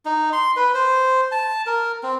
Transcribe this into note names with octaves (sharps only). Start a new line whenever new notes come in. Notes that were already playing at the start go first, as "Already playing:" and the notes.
D#4
C6
B4
C5
A5
A#4
C4